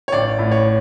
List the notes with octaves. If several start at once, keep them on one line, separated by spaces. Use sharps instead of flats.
C#5
A1 D5
A2
C#5